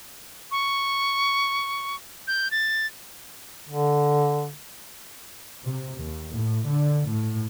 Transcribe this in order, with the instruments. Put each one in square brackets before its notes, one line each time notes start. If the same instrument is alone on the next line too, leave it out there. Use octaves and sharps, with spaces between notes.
[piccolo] C#6
G6
A6
[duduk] D3
[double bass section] C3
D#2
A2
D3
A2